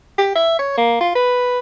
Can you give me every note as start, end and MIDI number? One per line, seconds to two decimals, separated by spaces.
0.18 0.33 67
0.35 0.58 76
0.59 0.74 73
0.77 1.00 58
1.01 1.13 65
1.15 1.59 71